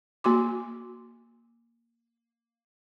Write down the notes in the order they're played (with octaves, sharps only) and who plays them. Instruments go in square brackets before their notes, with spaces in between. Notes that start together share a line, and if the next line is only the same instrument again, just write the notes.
[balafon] A#3 F#4 C6 D6